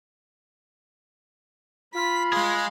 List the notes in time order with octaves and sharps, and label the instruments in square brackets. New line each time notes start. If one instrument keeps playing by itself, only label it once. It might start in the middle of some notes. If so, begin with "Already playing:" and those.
[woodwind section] F4 [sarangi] B5 [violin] B6
[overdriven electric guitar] G#3 G#4 [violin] F5 C6